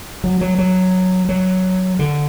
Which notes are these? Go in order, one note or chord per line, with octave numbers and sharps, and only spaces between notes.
F#3
F#3
F#3
F#3
D3